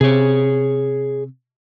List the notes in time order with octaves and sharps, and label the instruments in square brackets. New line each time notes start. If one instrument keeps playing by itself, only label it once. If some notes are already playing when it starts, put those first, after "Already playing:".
[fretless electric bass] C3 [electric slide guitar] G#4 C#5